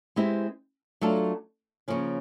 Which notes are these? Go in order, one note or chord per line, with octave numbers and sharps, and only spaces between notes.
G#3 C4 E4 G4 B4
F#3 A3 D4 F4 A4
C#3 F3 A#3 C#4